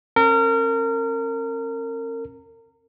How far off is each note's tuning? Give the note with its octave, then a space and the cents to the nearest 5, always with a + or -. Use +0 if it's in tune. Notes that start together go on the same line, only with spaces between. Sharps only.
C#4 -45 A#4 -30